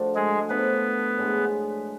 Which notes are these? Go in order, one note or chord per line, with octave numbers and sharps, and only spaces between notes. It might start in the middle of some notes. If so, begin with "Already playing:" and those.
Already playing: F3 A3 D4 F#4
G#3 G#4
F3 A3 B3 D4 F#4 B4
A2 G#3 D4